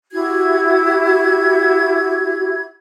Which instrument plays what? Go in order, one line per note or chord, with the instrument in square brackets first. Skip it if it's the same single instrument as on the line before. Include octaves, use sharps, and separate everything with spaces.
[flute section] E4 F#4 G4 G#6